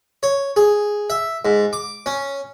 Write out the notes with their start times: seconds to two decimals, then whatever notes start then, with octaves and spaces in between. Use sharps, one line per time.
0.23 C#5
0.56 G#4
1.10 E5
1.45 G#2
1.73 D6
2.06 C#4